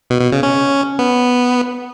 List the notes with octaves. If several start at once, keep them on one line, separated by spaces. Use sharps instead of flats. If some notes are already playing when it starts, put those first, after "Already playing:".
B2
B2
C#3
C#4
B3